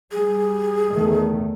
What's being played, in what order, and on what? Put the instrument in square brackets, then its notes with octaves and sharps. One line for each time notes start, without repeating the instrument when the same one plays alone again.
[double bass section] G3 [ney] G#4
[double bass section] E2 D#3 A3